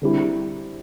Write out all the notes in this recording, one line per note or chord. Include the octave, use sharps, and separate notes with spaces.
D3 G3 C4 E4 G4